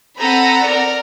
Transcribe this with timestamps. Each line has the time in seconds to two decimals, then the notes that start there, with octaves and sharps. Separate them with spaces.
0.18 C4 A4 F#5 A#5 B5 D#7
0.64 A#4 D5